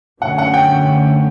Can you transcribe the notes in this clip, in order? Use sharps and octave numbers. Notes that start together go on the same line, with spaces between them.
F#2 D3 A3 C#4 F#5
F#5
G5